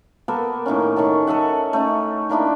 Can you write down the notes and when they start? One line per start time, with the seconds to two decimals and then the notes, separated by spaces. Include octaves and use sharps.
0.28 A#3 B3 A4
0.66 A2 D#3 A#3 C#4
0.96 D#3 C#5 F#5 A5
1.27 A4 D#5 E5 F#5
1.73 A3 C#4 D#4
2.29 D#3 A#3 D4 E4